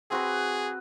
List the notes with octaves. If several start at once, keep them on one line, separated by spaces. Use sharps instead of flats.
C4 F#4 G#4 B4